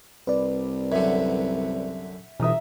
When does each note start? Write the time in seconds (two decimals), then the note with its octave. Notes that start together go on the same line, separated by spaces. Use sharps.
0.27 C2 B4 D5
0.92 F#2 D3 E5 F#5
2.40 G1 B2 E3 E5 A#5 D#6